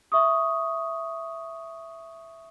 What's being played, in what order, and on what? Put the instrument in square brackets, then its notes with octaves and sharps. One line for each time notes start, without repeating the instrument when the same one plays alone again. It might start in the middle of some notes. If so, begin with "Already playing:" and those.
[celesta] E5 C#6 D#6